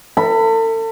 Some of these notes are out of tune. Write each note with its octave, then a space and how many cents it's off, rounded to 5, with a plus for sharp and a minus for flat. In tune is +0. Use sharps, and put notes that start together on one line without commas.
A4 +40 B5 +0